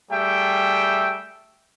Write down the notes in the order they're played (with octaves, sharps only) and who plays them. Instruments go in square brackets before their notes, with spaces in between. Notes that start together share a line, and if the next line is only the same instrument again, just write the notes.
[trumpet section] G3 A3 G#4 E5 G5